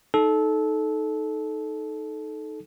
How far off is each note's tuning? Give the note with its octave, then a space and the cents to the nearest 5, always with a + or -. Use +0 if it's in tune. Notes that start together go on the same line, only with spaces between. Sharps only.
D#4 +0 A4 -20